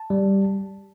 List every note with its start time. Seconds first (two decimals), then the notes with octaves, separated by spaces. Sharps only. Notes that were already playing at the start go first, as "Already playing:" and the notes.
Already playing: A5
0.10 G3